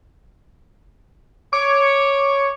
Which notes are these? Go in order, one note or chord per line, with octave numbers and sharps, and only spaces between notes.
C#5 D6